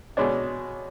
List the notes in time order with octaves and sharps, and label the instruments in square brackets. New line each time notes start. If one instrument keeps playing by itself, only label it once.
[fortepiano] B2 G#3 D4 [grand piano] C#5